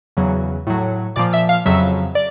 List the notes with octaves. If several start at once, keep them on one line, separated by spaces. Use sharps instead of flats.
E2 C#3 F#3
A2 F#3
A#2 F3 D5 D6
E5 E6
F5 F6
F2 C#3 F#3 E5 E6
D5